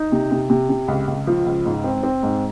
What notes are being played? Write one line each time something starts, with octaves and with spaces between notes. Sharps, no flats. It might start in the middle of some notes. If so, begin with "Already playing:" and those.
Already playing: D#4
C3
C3
C3
C3
C#2
C#2
F3
C#2
G#2
C4
C4
G#2